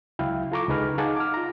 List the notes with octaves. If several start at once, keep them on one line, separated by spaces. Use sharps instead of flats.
C#2 F#3 E4 F5 G5
F4 A4 A#5 C#6 D6
C#2 D#4 G#4 B4 A#5 F6
D#4 G#4 F5 F#5 A5 D6
D6 F6
F4 A#5